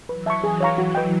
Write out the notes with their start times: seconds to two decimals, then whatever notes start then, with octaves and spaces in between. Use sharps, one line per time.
0.09 E3 F#3 B4
0.26 E5 A5 C#6
0.44 G#4
0.61 C#5 F5 A#5 C#6
0.78 F#4
0.95 B4 D#5 G5